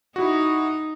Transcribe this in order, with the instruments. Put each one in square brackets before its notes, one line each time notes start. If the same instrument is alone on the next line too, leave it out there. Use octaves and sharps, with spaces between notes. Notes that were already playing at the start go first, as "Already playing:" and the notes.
[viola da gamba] D#4 [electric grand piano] E4 F#4